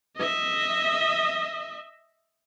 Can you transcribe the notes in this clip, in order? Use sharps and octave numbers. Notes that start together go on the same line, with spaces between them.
D#5 E5